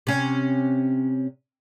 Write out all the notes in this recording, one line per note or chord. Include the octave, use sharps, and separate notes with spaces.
C3 C#4